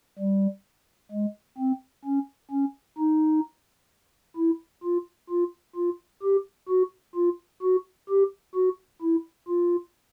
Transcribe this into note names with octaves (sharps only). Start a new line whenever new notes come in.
G3
G#3
C4
C#4
C#4
D#4
E4
F4
F4
F4
G4
F#4
F4
F#4
G4
F#4
E4
F4